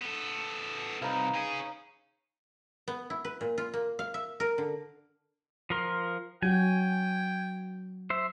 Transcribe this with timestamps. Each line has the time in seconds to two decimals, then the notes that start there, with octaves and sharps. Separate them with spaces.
0.01 B3 A4
1.02 C2 D#4 B4 F5
1.34 C#4 G#4
2.88 B3
3.10 E4
3.25 B4
3.41 A#2
3.58 F4
3.74 A#3
3.99 F5
4.14 E5
4.40 A#4
4.58 D3
5.70 F3 A#4 C6
6.43 F#3 F#4 G5 G#5
8.10 C5 E5